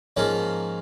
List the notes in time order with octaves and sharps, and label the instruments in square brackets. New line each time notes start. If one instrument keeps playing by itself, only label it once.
[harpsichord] G#2 F3 A#3 C#4 F4